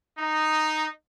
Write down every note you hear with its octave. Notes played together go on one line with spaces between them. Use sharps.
D#4